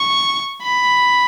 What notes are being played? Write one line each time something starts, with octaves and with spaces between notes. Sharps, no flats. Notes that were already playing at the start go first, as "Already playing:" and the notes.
Already playing: C#6
B5